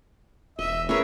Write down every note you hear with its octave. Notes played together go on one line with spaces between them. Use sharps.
E1 D#5 E5
C#4 G#4 A#4 B4 C#5 E5